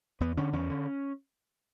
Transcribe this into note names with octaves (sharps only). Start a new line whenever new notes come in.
E2 B3
D3 C#4
E2 C#4
D3